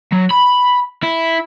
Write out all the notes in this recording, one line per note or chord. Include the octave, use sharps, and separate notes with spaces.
F#3
B5
E4